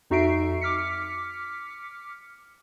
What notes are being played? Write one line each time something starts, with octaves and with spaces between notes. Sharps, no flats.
F2 D#4 F#4 E5 C7 D7
D6 F6 B6 C#7